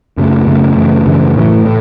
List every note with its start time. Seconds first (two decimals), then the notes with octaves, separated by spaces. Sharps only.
0.17 F#2 C#3 A3
0.46 F#2 C#3 A3
0.76 F#2 C#3 E3 A3
1.06 F#2 C#3 E3 A3
1.36 A2 E3 A3
1.65 A2